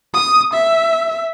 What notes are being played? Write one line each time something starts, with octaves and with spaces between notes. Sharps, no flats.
D#6
E5